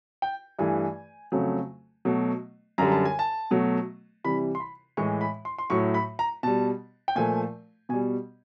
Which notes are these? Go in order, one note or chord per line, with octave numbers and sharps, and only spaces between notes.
G5
G2 E3 A3 G#5
F2 C#3 F#3 A3
B2 F#3 A3
F#2 D3 G3 A#5
A5
G#5
A5
B2 F#3 A3
C3 E3 G3 B5
C6
B5
A2 E3 G#3 C#6
B5
C6
C6
A2 F#3 A3 C#6
B5
A#5
B2 G3 A5
G5
A#2 F3 A3 G#5
B2 G3 G#5